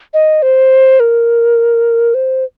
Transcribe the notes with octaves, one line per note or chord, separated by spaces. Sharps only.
D#5
C5
A#4
C5